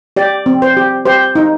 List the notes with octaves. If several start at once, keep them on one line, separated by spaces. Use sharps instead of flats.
G4 D5
C4
C5
G4
G4 C5
D#4